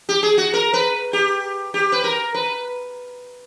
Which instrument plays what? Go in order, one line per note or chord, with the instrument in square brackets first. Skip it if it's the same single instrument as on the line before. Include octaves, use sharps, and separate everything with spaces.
[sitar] G4
G#4
F#4
A#4
B4
G4
G4
B4
A#4
B4